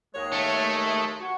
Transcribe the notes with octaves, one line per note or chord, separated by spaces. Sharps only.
D#2 G#3 C#5
A3
F#4 C#6